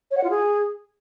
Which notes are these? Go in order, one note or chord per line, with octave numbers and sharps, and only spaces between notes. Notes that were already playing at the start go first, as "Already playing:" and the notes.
C#5
F#5
F4
G#4